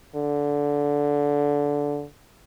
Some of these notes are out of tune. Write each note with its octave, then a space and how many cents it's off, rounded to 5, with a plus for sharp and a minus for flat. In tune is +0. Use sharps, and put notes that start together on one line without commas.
D3 -15